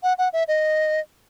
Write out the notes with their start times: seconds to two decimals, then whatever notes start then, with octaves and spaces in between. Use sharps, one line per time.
0.03 F#5
0.18 F#5
0.33 E5
0.48 D#5